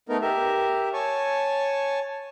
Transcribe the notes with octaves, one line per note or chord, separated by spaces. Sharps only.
A3 B3 D#4 A#4
G4 A#4 E5
C#5 G#5 A5 C#6